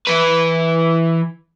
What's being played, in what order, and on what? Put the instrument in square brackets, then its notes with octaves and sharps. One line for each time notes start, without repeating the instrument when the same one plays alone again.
[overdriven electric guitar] E3 B4